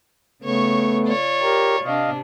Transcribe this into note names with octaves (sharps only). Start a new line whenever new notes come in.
C#3 A3 B3 C#5 C#6
F4 C#5 D5
G4 A#4
C3 D4 D#5 F5